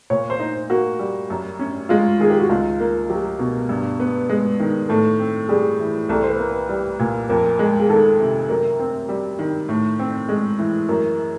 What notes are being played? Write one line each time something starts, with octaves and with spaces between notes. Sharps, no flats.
A#2 C#5
C5
D#4
A#3 F#4
G3
F#2
C#4
G#3 F4
D#3 G#4
G4
F#4
C#2 F4
A#3
F#3 G4
B2
G2
B3
G#3
D#3
A2 A4
C4
G3 G#4
E3
C2 A4
C5
B4
A#3
B4
G3
A#2
F2 A#4
G#3
G#4
D#3 A4
C3
F#2 A#4
C4
G3
D#3
A2
C4
G#3
E3
F#2 A#4